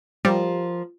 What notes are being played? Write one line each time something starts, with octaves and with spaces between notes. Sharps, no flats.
F3 G3 A#4